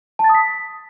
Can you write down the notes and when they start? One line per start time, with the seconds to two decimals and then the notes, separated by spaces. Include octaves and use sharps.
0.19 A5
0.24 A6
0.29 D#6
0.35 B6